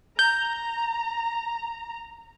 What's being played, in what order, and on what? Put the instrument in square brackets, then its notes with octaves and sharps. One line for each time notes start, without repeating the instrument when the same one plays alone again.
[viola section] A#5 [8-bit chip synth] G6